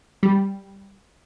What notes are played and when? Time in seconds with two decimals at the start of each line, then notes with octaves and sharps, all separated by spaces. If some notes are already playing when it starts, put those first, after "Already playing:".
0.23 G3